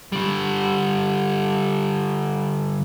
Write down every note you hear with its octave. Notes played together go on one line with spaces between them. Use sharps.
D3 G3